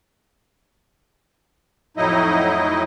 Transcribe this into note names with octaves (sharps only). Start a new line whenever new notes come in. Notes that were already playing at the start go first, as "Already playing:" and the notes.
F2 A2 F#3 D#4 E4 D#5